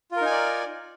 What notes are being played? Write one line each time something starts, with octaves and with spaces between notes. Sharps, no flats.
D#4 F4 A#4 D5 G#5